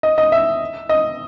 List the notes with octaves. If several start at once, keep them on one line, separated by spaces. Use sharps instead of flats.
D#5
D#5
E5
D#5